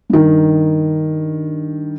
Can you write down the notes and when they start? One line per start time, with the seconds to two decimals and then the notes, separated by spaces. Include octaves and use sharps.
0.10 G2 D#3